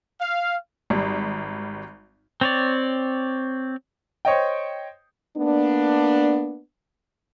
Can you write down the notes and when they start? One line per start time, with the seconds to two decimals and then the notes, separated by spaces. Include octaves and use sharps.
0.19 F5
0.90 G#1 G3
2.41 C4 C#5 D5
4.25 C5 C#5 D#5 G5
5.38 A#3 B3 D4